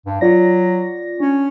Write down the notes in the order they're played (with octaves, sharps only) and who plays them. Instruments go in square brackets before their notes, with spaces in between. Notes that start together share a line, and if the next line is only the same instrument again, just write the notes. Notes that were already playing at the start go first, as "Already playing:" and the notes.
[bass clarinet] G2
[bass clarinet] F#3 [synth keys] F4 D5 A#6
[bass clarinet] C#4 [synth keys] D4